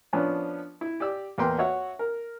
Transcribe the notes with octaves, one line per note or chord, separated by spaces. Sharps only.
F3 B3 C#4 D4
E4
G4 D5 E6
E2 A#3 B4 G5 C6
F#4 C#5 E5 F#5
A#4